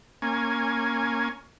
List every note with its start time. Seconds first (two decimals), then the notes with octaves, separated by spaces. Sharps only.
0.22 A#3 C#4 G#5